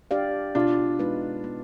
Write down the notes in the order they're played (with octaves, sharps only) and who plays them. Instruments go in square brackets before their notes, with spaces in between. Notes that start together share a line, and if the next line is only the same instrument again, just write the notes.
[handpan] D4 G4 D5 F5
[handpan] B2 [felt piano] D4 F4
[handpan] G#3 B3 D#4 B4
B3